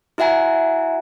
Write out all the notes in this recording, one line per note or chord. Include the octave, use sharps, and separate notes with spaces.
E4 F#4 E5 F#5 G#5 A#5